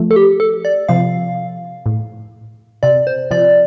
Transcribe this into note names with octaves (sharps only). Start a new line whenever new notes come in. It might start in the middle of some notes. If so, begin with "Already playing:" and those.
Already playing: F3 A3
A4
G4
A4
D5
C3 F3 F5
A2
C3 D5
C5
C3 F3 D5